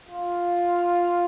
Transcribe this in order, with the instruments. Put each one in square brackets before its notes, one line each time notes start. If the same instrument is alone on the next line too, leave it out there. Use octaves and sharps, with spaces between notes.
[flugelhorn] F4